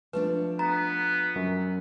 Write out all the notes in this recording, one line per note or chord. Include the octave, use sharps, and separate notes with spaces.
F3 A3 D4 B4
B3 A#5
F#2